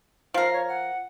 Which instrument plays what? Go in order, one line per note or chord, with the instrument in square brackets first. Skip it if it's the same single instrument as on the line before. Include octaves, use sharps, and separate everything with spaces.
[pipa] F3 A#4 [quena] F5
[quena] C#5
F#5